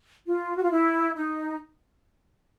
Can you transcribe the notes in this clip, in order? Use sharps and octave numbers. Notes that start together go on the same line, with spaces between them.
F4
F#4
F4
E4
D#4